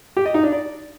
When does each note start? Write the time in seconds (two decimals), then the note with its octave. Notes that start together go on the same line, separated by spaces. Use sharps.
0.17 G4
0.25 D#5
0.34 D#4
0.43 D4
0.52 D5